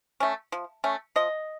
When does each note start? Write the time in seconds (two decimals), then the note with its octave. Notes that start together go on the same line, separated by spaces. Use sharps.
0.20 A3 C#4
0.52 F3
0.84 A3 C#4
1.16 F3 D#5